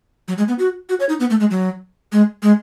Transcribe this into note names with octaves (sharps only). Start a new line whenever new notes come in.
F#3
G#3
B3
F#4
F#4
C#5
D#4
B3
A3
G#3
F#3
G#3
G#3